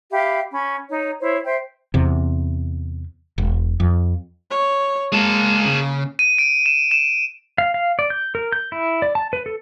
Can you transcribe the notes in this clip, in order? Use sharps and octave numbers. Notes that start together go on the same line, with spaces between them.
G4 E5 F5 B5
C#4 B5
D#4 C#5
E4 C5 C#5
C5 E5 G5
E2 C3
E1
F2
C#5
G#3 A#3 G#4 A5
C#3
D#7
D7
E7
E7
F5
F5
D5
G6
A#4
G6
E4
D5
A5
B4
A4